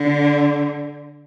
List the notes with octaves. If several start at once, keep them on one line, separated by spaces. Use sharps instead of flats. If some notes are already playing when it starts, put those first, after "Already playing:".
Already playing: D3